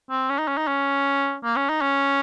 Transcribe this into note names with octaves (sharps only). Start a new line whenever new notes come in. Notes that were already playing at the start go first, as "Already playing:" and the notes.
C4
C#4
D#4
C#4
D#4
C#4
A#3
C#4
D#4
C#4